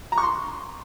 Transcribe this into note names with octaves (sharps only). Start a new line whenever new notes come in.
A#5
C#6
C6